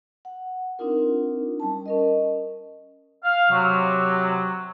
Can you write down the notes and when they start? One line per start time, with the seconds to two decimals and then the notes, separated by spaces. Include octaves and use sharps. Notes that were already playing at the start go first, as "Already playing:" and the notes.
0.25 F#5
0.79 C4 D4 D#4 F4 A#4
1.60 G3 C#4 A5
1.86 C#4 A#4 D#5
3.24 F5
3.51 C3 F#3